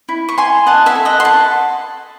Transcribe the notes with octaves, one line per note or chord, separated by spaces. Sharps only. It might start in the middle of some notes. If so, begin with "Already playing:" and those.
E4
C#6
E4 G#5 C6
D#5 F#5 A5
E5 G#5
A4
D#5 F#5
C6
E4 F#5 A5